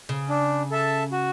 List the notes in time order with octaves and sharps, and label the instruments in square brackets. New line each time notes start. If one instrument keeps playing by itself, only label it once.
[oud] C#3
[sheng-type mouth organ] D4
A4 E5 A5
F#4